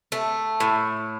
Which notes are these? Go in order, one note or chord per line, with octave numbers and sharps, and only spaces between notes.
A3
A2